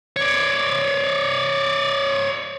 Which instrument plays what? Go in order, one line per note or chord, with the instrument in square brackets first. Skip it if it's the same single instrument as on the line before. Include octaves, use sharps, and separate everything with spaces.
[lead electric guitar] C#5 D5